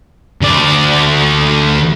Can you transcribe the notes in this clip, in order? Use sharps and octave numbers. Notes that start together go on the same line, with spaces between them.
D2 D5